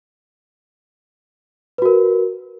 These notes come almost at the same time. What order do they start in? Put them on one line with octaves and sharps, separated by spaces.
B4 F#4 A#4